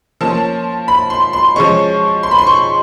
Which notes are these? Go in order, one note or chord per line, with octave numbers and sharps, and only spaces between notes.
F3 A#3 C#4 A5
B5
C6
C6
F3 G#3 C#4 C#6
C6
B5
C6
C#6